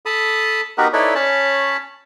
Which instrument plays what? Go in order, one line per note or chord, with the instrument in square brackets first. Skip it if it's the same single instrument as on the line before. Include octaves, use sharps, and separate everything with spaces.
[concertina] A4 A5 B5 D#6
B3 D#4 F#4 G4 A#4 B4
D#4 E4 A4 B4 C#5 D5
C#4 C#5 A5 B5